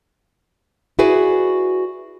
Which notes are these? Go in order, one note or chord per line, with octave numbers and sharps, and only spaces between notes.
E4 F#4 G#4 B4 D5